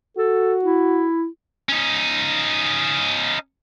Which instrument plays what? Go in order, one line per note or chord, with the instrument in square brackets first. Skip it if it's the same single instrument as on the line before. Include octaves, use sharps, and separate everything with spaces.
[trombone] F#4 [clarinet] A4
[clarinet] E4
[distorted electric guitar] C#4 D#4